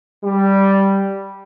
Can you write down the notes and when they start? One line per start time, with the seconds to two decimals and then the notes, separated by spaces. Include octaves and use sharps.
0.24 G3